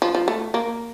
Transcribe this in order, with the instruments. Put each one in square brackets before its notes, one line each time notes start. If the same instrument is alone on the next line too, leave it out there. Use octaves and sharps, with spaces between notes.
[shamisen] F3
F3
A3
A#3